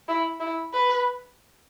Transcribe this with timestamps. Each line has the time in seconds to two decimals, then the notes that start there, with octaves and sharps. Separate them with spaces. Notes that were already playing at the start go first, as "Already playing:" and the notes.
0.08 E4
0.40 E4
0.73 B4